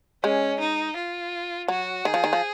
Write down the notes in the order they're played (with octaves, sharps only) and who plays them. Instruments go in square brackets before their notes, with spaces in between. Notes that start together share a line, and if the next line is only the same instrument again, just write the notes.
[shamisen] G#3 [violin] C#4
[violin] D#4
F4
[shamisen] F#3 [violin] F#4
[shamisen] D#3 [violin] G#4
[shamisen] F3
D#3
F3